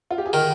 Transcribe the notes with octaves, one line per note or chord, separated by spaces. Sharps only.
F4
G4
G#4
D#3 A#4